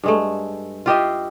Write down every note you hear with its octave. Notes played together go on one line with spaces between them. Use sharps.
G2 G#3 A3
F4 G4 D#5 E5